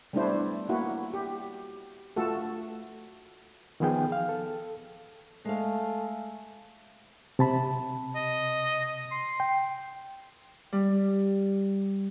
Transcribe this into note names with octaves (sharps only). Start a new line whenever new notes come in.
G3 A3 B3 D4 E4 C5
A#3 E4 F#4
G4
A3 F4 F#4 A4
D#3 F3 B3 G#4 G5
F5
A4
G#3 A3 F5
C3 A5 B5
D#5
C6
G5
G3